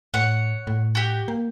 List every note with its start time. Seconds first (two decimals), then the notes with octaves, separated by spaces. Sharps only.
0.14 A2 C#5 F#5
0.67 A2
0.95 F#4 G4
1.28 A#3